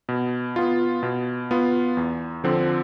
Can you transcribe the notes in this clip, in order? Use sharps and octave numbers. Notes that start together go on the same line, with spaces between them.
B2
B3 F4
B2
B3 F4
E2
D3 F3 C4